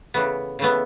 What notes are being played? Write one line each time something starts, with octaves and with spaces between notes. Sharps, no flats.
C#3 E3 A3 B3
C#3 E3 A3 B3